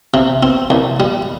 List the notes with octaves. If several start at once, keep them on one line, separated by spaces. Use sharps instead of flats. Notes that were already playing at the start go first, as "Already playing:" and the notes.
C3
C4
C2
G3